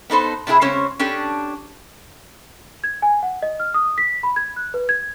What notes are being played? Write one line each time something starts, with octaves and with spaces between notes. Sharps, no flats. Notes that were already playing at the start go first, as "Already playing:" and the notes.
B3 D#4 A4 C5
C3 D4 E4 G#4 E5
C#3 G#3 C4 C#4 C5 C#5
C#4 D4 G4 A4
G#6
G#5
F#5
D#5
F6
D#6
B6
B5
G#6
F#6
B4
G#6